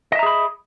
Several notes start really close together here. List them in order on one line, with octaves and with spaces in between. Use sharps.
D#5 E5 A#5 G#4 B5